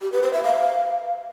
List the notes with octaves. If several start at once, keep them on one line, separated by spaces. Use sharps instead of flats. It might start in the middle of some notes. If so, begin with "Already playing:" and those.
G4
B4
C5
E5
F5